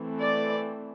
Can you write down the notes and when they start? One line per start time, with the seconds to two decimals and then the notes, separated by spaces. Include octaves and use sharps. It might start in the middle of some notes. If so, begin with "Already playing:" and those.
Already playing: E3 A3 C4
0.21 D5